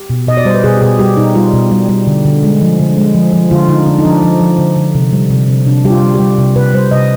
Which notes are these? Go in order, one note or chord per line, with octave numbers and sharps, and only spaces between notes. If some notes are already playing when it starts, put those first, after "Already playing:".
Already playing: G4
B2
B2 D#5
D5
G3 C5
B4
B2 G#4
G4
B2 G#4
G3 G4
B2 D#4
G3 F4
B2
G3
G3
D3
D3
G#3
F3
D3
G#3
F3
F3
D3 F4
D3 D#4
D3 D4
D#4
F3 D4
F3
F3
D3
D3
C3
G3
C3
C3
C3 D4
G3 G4
F4
G3
G4
G3
C3
C3 B4
G3 C5
C3 D#5